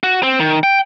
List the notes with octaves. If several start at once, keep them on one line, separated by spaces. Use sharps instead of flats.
F#4
C4
D#3
G5